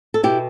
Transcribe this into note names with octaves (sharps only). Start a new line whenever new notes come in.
A4
B2 E4 G4